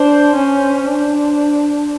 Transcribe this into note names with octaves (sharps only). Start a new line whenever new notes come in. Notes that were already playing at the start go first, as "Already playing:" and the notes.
Already playing: D4 C5
C#4
D4